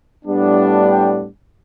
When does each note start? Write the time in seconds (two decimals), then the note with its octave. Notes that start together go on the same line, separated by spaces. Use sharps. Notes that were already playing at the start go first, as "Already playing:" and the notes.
0.25 A2 G3 B3 D4
0.89 G5